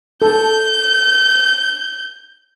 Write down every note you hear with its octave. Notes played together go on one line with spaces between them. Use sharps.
A4 G6